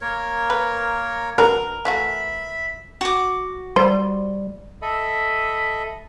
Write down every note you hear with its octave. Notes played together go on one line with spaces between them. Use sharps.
A#3 A#4 C#5
B4
D4 F#4 A#4 B4
E3 A3 F#4 E5 B5
F#4 D6
G3 C5
A4 D#5 E5 B5